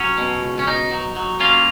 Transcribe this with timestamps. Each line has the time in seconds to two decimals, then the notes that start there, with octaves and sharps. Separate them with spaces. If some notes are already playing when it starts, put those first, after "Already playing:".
Already playing: F#3 C#4
0.18 B2
0.41 C#2
0.59 C#4
0.67 B2 D#4
0.91 F#3
1.16 F#3
1.40 A#3 C#4 F4